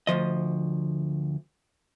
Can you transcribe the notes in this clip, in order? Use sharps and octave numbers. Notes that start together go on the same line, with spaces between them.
D2 D#3 F3 D#5